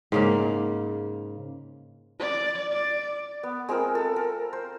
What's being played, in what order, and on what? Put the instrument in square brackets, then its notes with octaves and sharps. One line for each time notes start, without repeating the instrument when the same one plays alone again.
[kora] G#2 C#3 A#3
[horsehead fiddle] D5
D5
[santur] B3
G#3 C4 F4 A#4
A4
A#4
C5